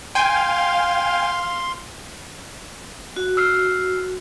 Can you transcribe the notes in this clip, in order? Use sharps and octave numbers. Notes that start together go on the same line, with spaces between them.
F5 G5 G#5 C6
F#4
E6 F6 C7